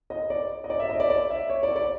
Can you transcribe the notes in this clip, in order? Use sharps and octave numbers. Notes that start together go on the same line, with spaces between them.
D#5
D5
D#5
D5
E5
D#5
D5
D5
E5
C#5
D5
D5